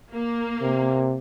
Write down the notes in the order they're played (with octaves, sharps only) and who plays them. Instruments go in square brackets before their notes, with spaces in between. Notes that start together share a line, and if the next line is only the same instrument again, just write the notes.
[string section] A#3
[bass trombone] C3